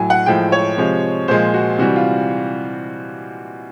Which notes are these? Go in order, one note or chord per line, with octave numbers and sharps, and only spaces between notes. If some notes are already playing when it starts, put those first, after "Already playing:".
Already playing: A2 F#3 G#5
F#5
A2 F3 G#3 G5
C#5
C3 F3 G#3
A#2 F3 G#3 C5
F#4
C3 E3 G3 F#4
F4